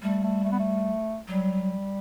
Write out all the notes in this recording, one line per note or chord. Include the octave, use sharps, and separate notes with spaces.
G3 A3
A3
A3
B3
A3
F#3 G3